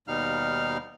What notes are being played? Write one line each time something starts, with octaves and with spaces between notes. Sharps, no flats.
D#2 B2 G3 D#4 F5 F6